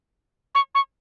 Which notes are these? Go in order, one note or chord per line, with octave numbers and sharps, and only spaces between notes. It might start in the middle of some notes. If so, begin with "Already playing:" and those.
C#6
C#6